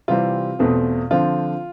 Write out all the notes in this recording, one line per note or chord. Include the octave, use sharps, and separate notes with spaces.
C3 E3 G3 C4 F4
E2 B2 A3 C4
D3 F3 C4 F4